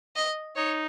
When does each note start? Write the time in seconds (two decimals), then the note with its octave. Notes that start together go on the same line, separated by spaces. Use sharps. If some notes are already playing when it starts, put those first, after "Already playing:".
0.16 D#5
0.56 D#4 C#5